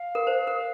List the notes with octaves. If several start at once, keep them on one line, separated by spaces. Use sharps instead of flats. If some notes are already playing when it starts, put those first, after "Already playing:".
Already playing: F5
A#4
C5
A#4